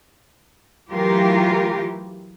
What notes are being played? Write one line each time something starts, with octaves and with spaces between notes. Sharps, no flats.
E3 F#3 A3 F4 G4 A#4